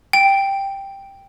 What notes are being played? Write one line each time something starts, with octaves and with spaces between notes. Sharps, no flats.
G5